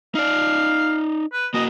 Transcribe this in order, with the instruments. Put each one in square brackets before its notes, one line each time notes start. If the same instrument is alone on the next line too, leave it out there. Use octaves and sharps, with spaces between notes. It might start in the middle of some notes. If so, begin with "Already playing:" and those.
[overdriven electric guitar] D#4 D5 [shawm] F5
[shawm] B4
[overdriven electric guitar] A#3 F#4 [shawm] D#5